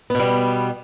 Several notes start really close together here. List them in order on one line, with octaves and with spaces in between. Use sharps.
B3 B2 G3